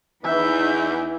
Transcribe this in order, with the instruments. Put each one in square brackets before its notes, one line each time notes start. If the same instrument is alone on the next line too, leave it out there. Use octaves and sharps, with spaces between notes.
[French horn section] E2 [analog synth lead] E3 [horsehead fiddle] D#4 B4 [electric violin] E5 G6